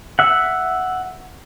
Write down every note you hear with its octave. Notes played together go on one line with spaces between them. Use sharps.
E5 F#5